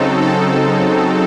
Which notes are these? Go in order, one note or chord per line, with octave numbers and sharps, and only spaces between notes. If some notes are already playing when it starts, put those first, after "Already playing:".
Already playing: C#3 F#3 C4 D#4 A4
A4